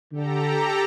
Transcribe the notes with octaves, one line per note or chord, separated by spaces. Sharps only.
D3 G4 A4 A#5